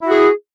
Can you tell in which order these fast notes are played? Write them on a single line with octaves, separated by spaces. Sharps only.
E4 F#4 G#4